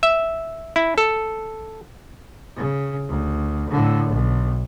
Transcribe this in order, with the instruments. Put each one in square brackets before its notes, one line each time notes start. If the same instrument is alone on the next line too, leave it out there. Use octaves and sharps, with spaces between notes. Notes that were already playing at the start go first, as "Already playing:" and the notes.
[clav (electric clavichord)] E5
E4
A4
[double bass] C#3
D2
A2 D3
B1